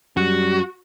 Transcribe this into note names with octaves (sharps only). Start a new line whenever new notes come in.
F#2 G3 F#4